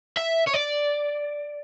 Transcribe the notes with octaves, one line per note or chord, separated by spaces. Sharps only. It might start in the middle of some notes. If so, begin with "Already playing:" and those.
E5
C#5
D5